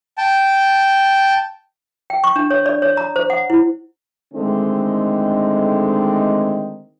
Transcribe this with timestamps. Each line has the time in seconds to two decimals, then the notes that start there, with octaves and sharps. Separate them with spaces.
0.18 G5 A5
2.10 G5
2.24 C#6
2.36 D4
2.51 C#5
2.66 D5
2.82 C#5
2.97 A#5
3.16 C5
3.30 F#5
3.50 E4
4.34 D3 D#3 G#3 A3 C4 D#4